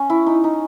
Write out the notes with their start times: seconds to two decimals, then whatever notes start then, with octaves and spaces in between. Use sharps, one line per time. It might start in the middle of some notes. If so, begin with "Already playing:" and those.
Already playing: C#4
0.10 E4
0.26 D#4
0.44 D#4